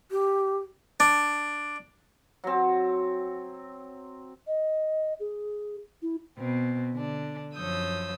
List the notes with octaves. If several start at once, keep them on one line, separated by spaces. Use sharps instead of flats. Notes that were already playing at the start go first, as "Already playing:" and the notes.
G4
D4
F#3 C4
D#5
G#4
E4
B2 C4
D3 D4
F#2 F3 C#5 D#6 E6 G6